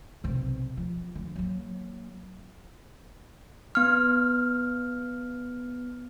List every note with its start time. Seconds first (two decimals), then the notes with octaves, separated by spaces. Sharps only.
0.24 B1 C3
0.77 F3
1.15 D3
1.36 F#3 A#3
3.75 B3 F6